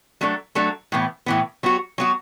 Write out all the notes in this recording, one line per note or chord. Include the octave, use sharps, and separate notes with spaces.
F#3 A3 D4 A4
F#3 A3 D4 A4
A2 E3 B3
A2 E3 B3
F#3 B3 F#4
F#3 B3 F#4